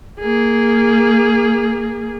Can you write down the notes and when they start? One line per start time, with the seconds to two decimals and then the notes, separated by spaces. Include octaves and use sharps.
0.20 A#3 G#4